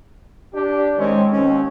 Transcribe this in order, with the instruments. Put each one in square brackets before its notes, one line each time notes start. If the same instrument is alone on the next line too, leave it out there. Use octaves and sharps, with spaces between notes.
[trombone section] D4 G4
[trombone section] D#3 C4 C#4 [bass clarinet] G#3
[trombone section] D#2 C4 [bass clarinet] C#4